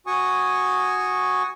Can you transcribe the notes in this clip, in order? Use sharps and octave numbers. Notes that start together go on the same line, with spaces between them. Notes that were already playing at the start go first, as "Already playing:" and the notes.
F#4 G#5 C#6 D#6